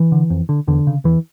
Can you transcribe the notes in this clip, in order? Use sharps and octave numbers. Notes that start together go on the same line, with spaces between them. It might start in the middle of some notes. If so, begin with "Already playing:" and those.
Already playing: E3
D3
F2
D3
E2 D3
C#3
E2 E3